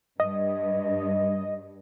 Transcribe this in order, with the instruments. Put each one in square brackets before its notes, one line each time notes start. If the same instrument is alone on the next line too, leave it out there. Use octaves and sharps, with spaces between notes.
[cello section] G2 [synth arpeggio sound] D#5